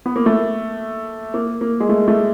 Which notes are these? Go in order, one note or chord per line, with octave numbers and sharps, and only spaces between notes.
B3
A#3
A3
A#3
A#3
G#3
A3
A3